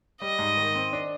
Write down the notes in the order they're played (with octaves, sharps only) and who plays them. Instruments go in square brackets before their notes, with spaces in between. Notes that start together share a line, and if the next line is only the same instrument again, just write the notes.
[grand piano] G3 [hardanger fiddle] D#5
[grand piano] G#2
D#3
C4
D4